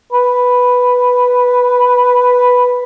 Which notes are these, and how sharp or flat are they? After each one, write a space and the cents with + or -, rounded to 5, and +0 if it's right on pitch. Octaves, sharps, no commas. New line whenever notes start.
B4 +0